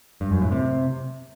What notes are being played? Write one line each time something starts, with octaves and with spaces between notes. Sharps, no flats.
G2
F#2
A2
C3